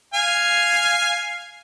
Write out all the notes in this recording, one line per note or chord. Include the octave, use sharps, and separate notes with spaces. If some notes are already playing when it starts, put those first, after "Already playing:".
F5 G#5